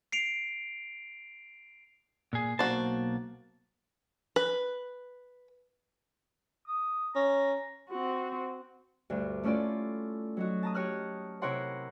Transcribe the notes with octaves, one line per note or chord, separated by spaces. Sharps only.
C7 D7 F7
A#2 G#4
B1 A#3 F#4 C5 A5
B4
D#6
C#4 A#5
C4 F#4
D2 G2 D4
A3 C#4 E4 F4 A4 D5
F#3 D#4 F#4
A5 A#5 D#6
G4 C#5 D#6 F6 F#6
C3 E4 A#4 C#5 F#5 C6